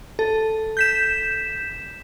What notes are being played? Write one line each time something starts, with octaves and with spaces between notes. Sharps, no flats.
A4
G6 B6 E7